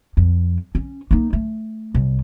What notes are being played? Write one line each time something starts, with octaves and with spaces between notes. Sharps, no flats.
F2
C#4
A#3 D#4
A3
C2